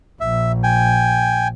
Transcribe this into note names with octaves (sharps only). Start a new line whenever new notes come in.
A#1 E5
G5 G#5